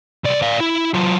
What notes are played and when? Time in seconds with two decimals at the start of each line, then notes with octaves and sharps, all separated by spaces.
0.24 C2 D5
0.42 D5 F5
0.60 E4
0.94 F#3 F4